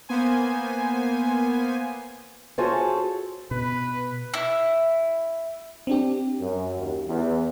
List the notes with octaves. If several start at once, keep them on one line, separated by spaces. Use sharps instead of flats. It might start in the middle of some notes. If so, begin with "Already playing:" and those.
A#3 B3 C5 G#5
F4 F#4 G#4 A4 C5 C#5
B2 B4
E4
C4 D4 G4
F#2
D#2
E2